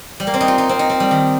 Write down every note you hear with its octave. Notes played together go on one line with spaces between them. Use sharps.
G3
A#3
C4
D#4
F4
D#4
C4
D#4
C4
G3
D#3